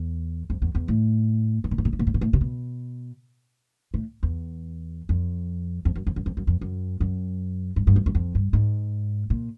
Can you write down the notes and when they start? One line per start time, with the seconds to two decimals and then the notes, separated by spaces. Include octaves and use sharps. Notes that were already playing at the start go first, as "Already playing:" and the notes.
Already playing: E2
0.50 F2
0.62 E2
0.75 E2
0.88 A2
1.64 A2
1.71 A#2
1.78 A2
1.85 A#2
1.93 A2
1.99 A#2
2.07 A2
2.14 A#2
2.21 A2
2.33 C3
2.41 B2
3.94 A2
4.23 E2
5.09 F2
5.85 F2
5.95 F#2
6.07 F2
6.16 F#2
6.26 F2
6.37 F#2
6.47 F2
6.61 F#2
7.00 F#2
7.76 G2
7.87 G2
7.96 F#2
8.06 F#2
8.15 F2
8.35 G2
8.53 G#2
9.30 A#2